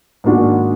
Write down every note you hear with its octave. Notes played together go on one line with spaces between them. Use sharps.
G#2 D#3 A#3 D4 F#4